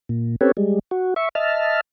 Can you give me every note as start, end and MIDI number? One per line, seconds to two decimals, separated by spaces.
0.09 0.36 46
0.41 0.52 60
0.41 0.52 61
0.41 0.52 67
0.41 0.52 69
0.41 0.52 71
0.41 0.52 73
0.57 0.79 55
0.57 0.79 56
0.91 1.14 66
1.16 1.29 76
1.16 1.29 85
1.35 1.81 75
1.35 1.81 76
1.35 1.81 81
1.35 1.81 89